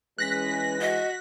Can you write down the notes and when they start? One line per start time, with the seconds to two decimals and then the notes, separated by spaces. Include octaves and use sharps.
0.18 E3 G#3 C#4 B4 F#6 A#6 B6
0.81 F#4 D#5